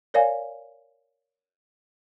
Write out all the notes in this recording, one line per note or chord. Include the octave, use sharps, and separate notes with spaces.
A#4 C#5 D5 F5 G#5